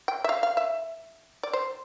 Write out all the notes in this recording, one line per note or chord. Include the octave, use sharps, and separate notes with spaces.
G5
E5
F5
F5
E5
D5
C5